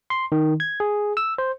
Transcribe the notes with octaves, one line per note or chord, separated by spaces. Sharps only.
C6
D#3
G#6
G#4
E6
C5